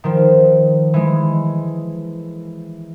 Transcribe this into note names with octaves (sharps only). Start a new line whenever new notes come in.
D#3 F3
E3 G#3